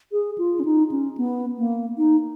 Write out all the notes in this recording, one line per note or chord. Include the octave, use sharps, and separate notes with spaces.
G#4
F4
C#4
D#4
C#4
B3
A#3
D#4